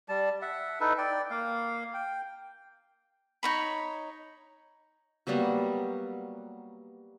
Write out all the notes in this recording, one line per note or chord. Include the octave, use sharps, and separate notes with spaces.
G3 A5
E5 F#5
D#4 E4 A4 B4
D5 G5
A#3 F5
G5
D#4 C#5 B5
F#3 G3 A#3 B3